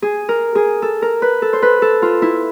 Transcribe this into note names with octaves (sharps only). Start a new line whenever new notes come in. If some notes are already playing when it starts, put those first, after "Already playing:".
G#4
A#4
G#4
A4
A#4
B4
A4
C5
B4
A4
F4
E4